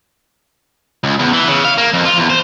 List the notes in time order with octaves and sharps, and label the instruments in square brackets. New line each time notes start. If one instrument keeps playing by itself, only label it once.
[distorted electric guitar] C#2
E2
E3
C#3
F5
A#3
F2
F4
E2
C5